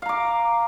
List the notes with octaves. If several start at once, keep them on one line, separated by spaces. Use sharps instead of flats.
F5 A#5 D6